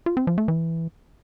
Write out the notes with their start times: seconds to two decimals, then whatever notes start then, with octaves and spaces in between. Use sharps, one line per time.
0.06 F4
0.17 C4
0.27 F3
0.38 A3
0.48 E3